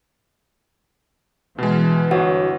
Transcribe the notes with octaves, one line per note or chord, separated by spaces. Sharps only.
B2 E3 G#3
G1 F#4 C#5 F#5